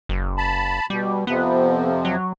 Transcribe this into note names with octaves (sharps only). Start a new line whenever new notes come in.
F#1
A5 B5
B2 G3
F2 C3 F3 B3
F#3